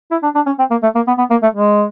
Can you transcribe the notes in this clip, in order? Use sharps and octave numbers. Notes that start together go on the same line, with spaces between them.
E4
D4
D4
C#4
C4
A#3
A3
A#3
B3
B3
A#3
A3
G#3